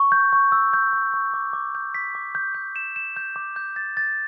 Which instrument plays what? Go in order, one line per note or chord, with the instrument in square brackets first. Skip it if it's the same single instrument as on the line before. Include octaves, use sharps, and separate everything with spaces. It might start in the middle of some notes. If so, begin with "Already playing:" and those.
Already playing: [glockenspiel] C#6
G6
C#6
E6
G6
C#6
C#6
D6
D6
G6
B6
D6
G6
G6
E7
E7
G6
D6
G6
A6
A6